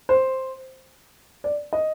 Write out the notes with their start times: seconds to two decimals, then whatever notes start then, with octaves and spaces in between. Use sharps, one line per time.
0.09 C5
1.44 D5
1.73 D#5